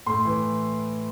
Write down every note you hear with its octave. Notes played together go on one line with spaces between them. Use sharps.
A2 C6
E3